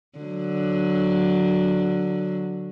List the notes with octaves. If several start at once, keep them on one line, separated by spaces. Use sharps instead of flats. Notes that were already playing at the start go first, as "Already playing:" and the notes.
D3 F#3